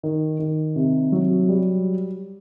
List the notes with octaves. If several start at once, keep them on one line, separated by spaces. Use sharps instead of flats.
D#3
D#3
C3
F#3
G3